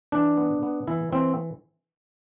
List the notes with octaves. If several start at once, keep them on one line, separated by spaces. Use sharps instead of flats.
E3 D4
B3
B3
E3 E4
E3 C4